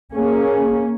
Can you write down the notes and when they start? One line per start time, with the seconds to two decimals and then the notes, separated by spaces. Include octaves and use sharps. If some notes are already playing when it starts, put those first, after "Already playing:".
0.14 A#3 C#4 G#4